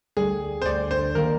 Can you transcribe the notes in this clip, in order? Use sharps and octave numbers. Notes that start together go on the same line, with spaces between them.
D2 D3 G3 G#4
C5
D2 D3 G3 D5
C5
D#3 G3 A#3 A#4